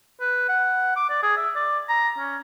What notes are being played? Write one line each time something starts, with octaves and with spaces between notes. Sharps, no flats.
B4
F#5
D6
D5
G#4
E5
D5
A#5
C#4